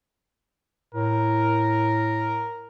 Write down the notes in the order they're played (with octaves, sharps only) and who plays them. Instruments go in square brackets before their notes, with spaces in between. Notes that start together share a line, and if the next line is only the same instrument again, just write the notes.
[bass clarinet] A2 [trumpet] A#4